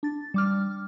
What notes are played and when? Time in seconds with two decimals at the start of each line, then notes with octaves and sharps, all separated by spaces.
0.03 D4 A6
0.34 G3 D6 F6